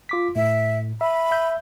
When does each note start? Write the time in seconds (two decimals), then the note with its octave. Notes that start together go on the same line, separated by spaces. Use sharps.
0.09 F4 D6 B6
0.36 A2 E5
1.01 E5 B5
1.31 E5 G6